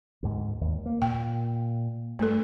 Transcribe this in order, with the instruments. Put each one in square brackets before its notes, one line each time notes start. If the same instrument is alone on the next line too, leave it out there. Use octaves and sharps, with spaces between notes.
[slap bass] D2 G#2
D#2
A#3
[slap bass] A#2 [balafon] G5
[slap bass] G2 [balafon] A3 A4